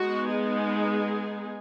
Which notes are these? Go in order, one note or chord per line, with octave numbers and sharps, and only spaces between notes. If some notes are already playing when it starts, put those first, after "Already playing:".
Already playing: G#3 B3 D#4 F#4
G#4